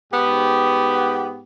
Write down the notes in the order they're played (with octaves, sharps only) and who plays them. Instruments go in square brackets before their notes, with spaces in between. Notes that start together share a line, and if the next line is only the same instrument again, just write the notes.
[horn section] G#2 B3 G4